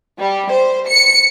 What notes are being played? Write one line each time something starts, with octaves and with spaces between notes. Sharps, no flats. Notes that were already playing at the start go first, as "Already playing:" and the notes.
G3
C5
C#7